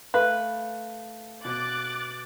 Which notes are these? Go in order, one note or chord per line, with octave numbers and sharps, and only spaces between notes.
A3 B4 F5
B2 D6 F#6 A6